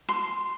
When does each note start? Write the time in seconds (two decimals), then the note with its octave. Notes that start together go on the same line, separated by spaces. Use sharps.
0.09 C6